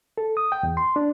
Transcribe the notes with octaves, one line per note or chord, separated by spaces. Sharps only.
A4
D#6
G5
E2
C6
D4